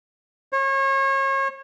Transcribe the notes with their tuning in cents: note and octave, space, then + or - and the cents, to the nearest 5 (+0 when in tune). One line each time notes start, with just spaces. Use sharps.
C#5 -35